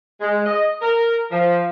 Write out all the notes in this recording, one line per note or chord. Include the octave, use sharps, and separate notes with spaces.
G#3
D#5
A#4
F3